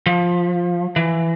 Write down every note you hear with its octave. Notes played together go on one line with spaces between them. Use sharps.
F3
E3